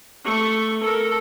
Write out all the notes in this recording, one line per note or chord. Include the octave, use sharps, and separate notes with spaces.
A3 C#6
A4 A#4